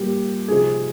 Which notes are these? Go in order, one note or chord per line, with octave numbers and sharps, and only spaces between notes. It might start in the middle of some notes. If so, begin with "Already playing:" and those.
Already playing: A#2 G3 A#3 G4
C3 F3 C4 D#4 G#4